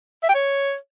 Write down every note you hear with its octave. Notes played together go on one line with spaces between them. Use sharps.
E5
G5
C#5